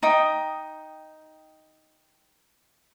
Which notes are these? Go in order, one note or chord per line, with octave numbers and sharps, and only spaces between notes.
D#4 G5 D#6